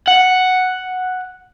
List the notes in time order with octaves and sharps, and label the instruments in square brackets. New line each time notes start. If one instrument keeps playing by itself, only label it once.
[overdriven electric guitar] F#5